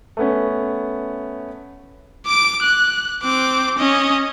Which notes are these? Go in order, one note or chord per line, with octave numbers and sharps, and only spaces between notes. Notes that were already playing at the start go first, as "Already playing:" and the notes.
A3 B3 C#4
D6 D7
F#6
C4 D6
C#4 D#5